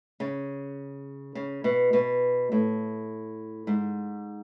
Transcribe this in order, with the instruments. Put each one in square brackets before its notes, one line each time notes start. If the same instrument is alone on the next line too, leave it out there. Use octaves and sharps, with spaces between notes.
[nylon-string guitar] C#3
C#3
B2
B2
A2
G#2